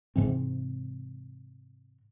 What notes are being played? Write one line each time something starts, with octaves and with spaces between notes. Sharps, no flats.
G#2 C3 E3 C4